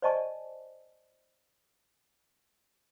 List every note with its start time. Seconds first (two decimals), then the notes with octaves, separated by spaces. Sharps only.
0.02 C5 D5 D#5 G#5 A5 C#6